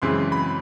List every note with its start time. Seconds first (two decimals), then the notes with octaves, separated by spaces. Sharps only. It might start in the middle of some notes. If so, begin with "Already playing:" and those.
0.02 F#2 C#3 E3 G#3 C4 C6
0.32 B5